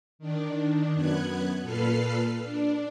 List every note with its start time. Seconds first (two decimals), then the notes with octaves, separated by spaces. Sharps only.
0.19 D#3 D4
0.93 F#2 B3 F#6 G#6
1.62 A#2 A4 B4 F6 C7
2.43 D4